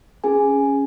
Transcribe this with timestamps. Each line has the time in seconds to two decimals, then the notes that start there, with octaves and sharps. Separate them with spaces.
0.24 C#4 G#4 G#5
0.52 C#4